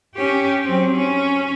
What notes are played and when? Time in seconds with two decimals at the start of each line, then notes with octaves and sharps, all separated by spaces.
0.15 C#4 G4
0.65 F#3 C4
0.95 C#4